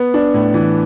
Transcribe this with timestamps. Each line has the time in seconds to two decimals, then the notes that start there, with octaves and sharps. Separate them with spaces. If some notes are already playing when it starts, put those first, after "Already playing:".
Already playing: B3
0.14 D4
0.34 A2
0.54 E3